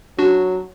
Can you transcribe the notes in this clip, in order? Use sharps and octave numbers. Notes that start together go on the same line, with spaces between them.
F#3 D4 F#4